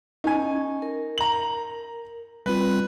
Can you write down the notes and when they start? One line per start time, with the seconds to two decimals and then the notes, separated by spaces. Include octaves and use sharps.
0.24 C#4 D#4 G#5
0.82 A#4
1.18 A#5 F#7
2.46 G3 C4 F4 B4